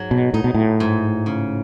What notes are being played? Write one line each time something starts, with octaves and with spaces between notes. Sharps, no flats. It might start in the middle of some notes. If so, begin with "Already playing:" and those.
Already playing: G#2 F#3
B2
A2 D#4
B2
A2
G#2
C#3